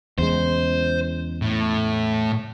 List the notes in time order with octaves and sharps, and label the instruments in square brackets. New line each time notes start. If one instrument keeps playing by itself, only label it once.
[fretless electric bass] E2 C#3 G#3 [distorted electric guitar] C5
[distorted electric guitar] A2